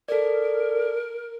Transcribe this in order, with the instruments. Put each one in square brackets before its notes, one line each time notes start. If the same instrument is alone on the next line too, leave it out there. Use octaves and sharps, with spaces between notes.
[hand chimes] A4 D5 [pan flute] A#4